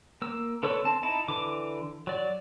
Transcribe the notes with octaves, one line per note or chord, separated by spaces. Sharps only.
A#3 E6
D3 A4 B4 C#5 E6
C4 A5
D#4 E4 A5
D3 E3 D6
F#3 D5